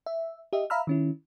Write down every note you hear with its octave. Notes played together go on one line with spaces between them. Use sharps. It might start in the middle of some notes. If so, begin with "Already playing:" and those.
E5
G4 D#5 E5
E5 F5 A#5 B5 E6 F6
D#3 C#4 E4